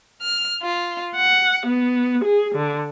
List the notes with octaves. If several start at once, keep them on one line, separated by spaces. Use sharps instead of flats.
F6
F4
F#5
B3
G#4
D3